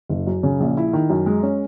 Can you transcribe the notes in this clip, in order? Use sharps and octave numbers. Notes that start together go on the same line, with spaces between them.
F#1
F#2
C#3
A#1
E4
D#3
F#2
G#3
C#4